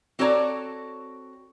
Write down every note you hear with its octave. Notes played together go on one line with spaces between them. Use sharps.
C4 F#4 A4 C#5 D5 A#5